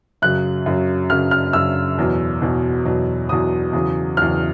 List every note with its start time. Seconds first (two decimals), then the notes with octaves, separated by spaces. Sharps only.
0.22 F#2 C#3 F#3 F#6
0.66 F#2 C#3 F#3
1.10 F#2 C#3 F#3 F6
1.31 F6
1.53 F#2 C#3 F#3 E6
1.98 E2 B2 F#3
2.42 E2 B2 F#3
2.85 E2 B2 F#3
3.29 E2 B2 F#3 D#6
3.73 E2 C#3 F#3
4.17 E2 C#3 F#3 F6